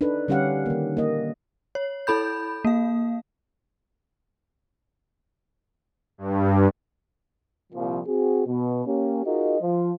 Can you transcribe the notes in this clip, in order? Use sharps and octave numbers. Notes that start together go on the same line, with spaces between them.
D4 D#4 A4 B4
D3 G3 C#4 G4 F5 F#5
D#3 A#3
A#3 D#5
C#5
E4 A4 B5 G6
A#3 F5
G2
C2 A#2 F3
C4 F#4 G#4
B2
A#3 C#4 G4
D#4 F4 F#4 G#4 A#4 D#5
F3